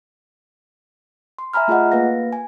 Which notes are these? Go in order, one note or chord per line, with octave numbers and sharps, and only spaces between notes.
C6
E5 G#5 A#5 B5 F6
A3 F4 G#4 D#5 F#5
A#3 B4 F5 A#6
G#5